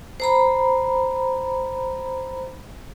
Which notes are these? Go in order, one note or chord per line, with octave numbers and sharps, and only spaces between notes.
C5 A#5 B5